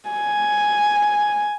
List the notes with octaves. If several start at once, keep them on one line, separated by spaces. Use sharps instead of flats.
G#5